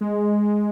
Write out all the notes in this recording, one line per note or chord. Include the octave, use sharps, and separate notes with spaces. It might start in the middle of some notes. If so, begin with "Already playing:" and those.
G#3